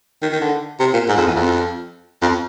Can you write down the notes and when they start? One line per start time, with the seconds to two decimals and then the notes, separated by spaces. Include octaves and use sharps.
0.22 D#3
0.32 D#3
0.41 D3
0.79 C3
0.93 A#2
1.08 G#2
1.17 F2
1.27 E2
1.35 F2
2.22 F2